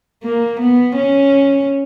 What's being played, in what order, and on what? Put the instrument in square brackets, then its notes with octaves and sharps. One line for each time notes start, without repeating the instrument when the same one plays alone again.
[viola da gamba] A#3
B3
C#4